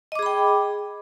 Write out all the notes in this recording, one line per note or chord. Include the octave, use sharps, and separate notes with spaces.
G#4 D#5 G5 B5 D6